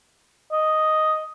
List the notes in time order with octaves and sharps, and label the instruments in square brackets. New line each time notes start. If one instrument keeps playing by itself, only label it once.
[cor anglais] D#5